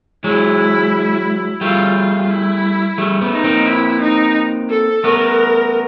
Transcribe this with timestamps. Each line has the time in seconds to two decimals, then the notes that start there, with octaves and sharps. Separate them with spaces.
0.24 F#3 G#3 E4
1.61 G3 A3 F4
1.96 F4
2.30 E4
2.98 G3 A3
3.21 A3 B3
3.33 D#4
3.44 A#3 C4
3.67 E4
4.01 D#4
4.70 A4
5.04 A3 B3 A#4